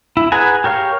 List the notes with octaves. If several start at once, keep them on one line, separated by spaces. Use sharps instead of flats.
E4
G#4 B4 F#5 G#5 A#5
G4 A#4 C#5 F5